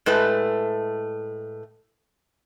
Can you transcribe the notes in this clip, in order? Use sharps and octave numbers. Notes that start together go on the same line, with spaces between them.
A2 G#3 A3 B4